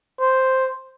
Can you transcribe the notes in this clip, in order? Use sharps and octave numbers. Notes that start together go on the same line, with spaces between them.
C5